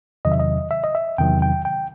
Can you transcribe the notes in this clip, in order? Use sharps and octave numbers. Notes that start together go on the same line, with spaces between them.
E2 C3 D#3 F#3 D#5
E5
D#5
E5
D#5
E5
E2 C3 D#3 F#3 G5
G5
G5